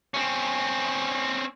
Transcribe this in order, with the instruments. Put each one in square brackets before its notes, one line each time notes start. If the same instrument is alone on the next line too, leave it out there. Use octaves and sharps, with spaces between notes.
[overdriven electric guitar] C4 C#4